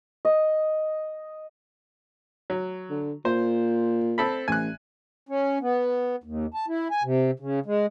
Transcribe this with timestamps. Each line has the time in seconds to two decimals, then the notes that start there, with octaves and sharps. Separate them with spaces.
0.25 D#5
2.50 F#3
2.90 D3
3.25 A#2 C5
4.18 C4 A4 B5
4.48 A1 G#5 F#6
5.29 C#4
5.61 B3
6.24 D#2
6.54 A5
6.68 E4
6.91 G#5
7.04 C3
7.40 C#3
7.66 G#3